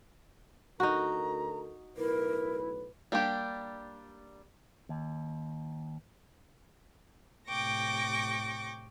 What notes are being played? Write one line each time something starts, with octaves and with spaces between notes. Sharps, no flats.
D2 D#4 F#4 A4 A#4 A#5
B1 A2 E4 A#4 B4
G3 A#3 D4 G4
D#2
A2 C3 G5 C#6 D6 A#6